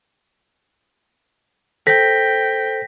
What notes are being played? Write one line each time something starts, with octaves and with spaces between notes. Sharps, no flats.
A4 C5 G5 A#6 B6